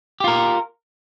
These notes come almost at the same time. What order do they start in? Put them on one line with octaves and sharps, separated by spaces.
G4 F4 A#4